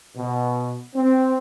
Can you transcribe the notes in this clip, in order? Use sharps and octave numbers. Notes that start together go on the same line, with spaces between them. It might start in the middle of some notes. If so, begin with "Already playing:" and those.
B2
C4